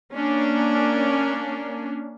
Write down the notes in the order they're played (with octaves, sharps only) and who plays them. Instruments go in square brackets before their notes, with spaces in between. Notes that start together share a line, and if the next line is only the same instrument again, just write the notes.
[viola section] A#3 C#4 D4